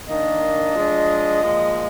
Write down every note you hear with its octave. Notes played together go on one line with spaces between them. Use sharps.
D#3 A#3 D4 D#5
F3 G#3 D4
A#2 F3 G#3